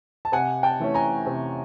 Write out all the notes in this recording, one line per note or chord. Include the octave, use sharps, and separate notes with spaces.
A5
C3 F#5 G#5
G5 A5
E3 A3 C#4
G#5 A#5
C3